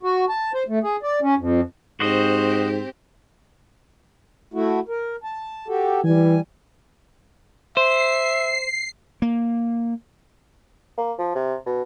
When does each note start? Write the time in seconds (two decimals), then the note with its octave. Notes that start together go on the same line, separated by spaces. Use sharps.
0.03 F#4
0.29 A5
0.54 C5
0.68 A3
0.83 G#4
1.03 D5
1.22 C#4
1.38 F2
2.00 G#2 C4 F#4 G4 C5 D#5
4.54 A3 E4 F#4
4.88 A#4
5.24 A5
5.68 F#4 G4 A4
6.04 E3 G3 G#5
7.77 C5 E5 C7
9.22 A#3
10.98 A#3
11.19 F3
11.35 C3
11.66 B2